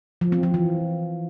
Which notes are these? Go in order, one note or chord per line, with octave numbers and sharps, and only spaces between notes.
F3
C4
F3
E3